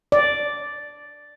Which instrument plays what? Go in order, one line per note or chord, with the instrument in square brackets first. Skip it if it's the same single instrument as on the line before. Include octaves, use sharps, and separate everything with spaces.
[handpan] D5